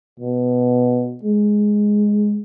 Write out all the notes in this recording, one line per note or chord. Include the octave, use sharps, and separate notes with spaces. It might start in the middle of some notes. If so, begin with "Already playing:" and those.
B2
G#3